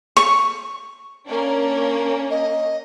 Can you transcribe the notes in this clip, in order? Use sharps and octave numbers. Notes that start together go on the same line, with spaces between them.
C#6
A#3 C#4 D4
D#5